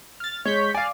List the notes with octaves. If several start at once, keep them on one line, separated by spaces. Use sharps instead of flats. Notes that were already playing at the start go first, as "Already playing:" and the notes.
F6 A6
G#3 C#5 G6 B6
D5 F5 G#5 D6